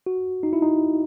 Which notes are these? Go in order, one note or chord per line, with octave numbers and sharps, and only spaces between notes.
F#4
D#4
E4
D#4